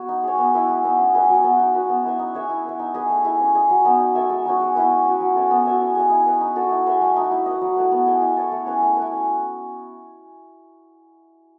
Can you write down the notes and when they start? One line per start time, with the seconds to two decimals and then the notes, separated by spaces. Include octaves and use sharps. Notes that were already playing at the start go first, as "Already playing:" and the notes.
Already playing: B3 F#4 C#5
0.09 D#4
0.23 G#4 C#5
0.38 B3
0.54 E4 B4
0.69 G#3
0.84 B3 D#4
0.99 C#4
1.14 G#4 B4 E5
1.29 F#3
1.44 B3 F#4
1.59 D#4
1.74 F#4 B4
1.89 B3
2.04 E4 B4 E5
2.19 D#4
2.34 G#4 C#5 E5
2.49 E4
2.65 B4 E5
2.79 D#4
2.94 G#4 B4 D#5
3.09 A3
3.24 E4 G#4
3.40 C#4
3.55 G#4 D#5
3.70 F#3
3.85 B3 D#4
4.00 D#4
4.15 A4 C#5 E5
4.30 G#3
4.45 D#4 F#4 C#5
4.60 G#3
4.75 B3 E4 B4
4.90 G#3
5.05 C#4 F#4
5.20 F#3
5.35 C#4 E4 A4
5.51 B3
5.65 F#4 C#5 E5
5.81 C#4
5.95 G#4 D#5
6.10 E4
6.26 B4 D#5
6.41 D#4
6.56 F#4 A4 C#5
6.70 E4
6.86 G#4 B4 E5
7.01 A3
7.16 D#4 F#4
7.31 E4
7.46 B4 D#5
7.61 F#3
7.76 A3 E4 B4
7.92 B3
8.06 E4 G#4 D#5
8.22 E4
8.36 A4 C#5
8.52 A3
8.66 C#4 G#4 B4
8.82 A3
8.97 B4
9.02 E4
9.12 C#4